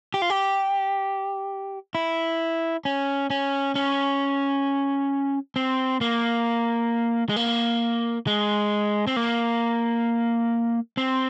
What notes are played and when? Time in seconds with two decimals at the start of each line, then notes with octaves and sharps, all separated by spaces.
0.14 G4
0.22 F4
0.30 G4
1.95 E4
2.85 C#4
3.30 C#4
3.76 C#4
5.56 C4
6.01 A#3
7.29 G#3
7.36 A#3
8.27 G#3
9.07 C4
9.16 A#3
10.97 C4